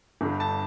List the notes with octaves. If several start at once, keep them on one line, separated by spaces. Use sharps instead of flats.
G1 G2 D3
A5